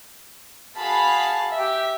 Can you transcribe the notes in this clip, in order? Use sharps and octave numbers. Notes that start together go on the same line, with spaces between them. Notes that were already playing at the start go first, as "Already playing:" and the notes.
F#4 G#4 F5 A5 B5
G4 E5